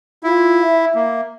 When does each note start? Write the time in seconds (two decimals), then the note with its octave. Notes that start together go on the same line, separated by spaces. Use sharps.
0.24 E4 F4
0.63 E5
0.95 A#3